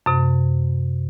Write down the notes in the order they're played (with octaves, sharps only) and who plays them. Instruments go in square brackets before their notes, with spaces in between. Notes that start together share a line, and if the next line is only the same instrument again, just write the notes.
[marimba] F#2 C3